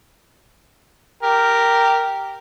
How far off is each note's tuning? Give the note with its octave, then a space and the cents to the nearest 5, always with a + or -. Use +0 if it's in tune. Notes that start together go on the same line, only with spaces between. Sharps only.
G4 -5 A#4 -5